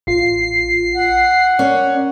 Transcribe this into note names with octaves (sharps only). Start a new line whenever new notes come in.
A1 F4 C7
F#5
C#4 A#4 D5